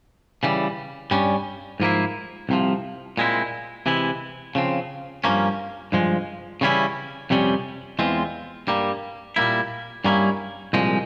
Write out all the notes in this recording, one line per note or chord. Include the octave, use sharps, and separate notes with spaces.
C#3 E3 G3
G2 G3 C#4
G#2 F3 A#3 E4
C2 C3 F3
A#2 G#3 C4 E4
C3 E3 G#3 E4
C#3 F3 C4
G2 F3 A#3 C#4
G2 F3 G#3
C#3 E3 G3 C#4 E4
F2 C3 G3 C#4
E2 E3 G#3 C4 F4
G2 G3 A#3
A#2 G3 A#3 E4
G2 G3 A#3 C#4 E4
C2 A#2 F3 G#3